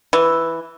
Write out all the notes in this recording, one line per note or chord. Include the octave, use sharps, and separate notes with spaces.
E3